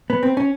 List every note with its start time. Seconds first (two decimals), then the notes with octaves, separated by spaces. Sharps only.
0.10 B3
0.23 C4
0.37 C#4